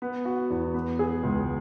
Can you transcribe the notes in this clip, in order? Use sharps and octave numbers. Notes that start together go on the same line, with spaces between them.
B3
F#4
E2
B3
G#4
C#2